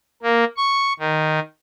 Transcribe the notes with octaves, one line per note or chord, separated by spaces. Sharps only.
A#3
C#6
D#3